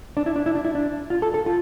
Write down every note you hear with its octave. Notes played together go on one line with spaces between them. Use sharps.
D4
E4
D4
E4
D4
E4
D4
F4
A4
A4
F4